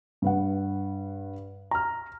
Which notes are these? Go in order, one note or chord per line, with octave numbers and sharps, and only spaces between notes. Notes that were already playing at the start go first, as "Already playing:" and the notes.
G2 B4 F#5
A#5 F6